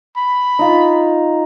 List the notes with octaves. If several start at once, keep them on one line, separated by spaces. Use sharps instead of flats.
B5
D#4 F4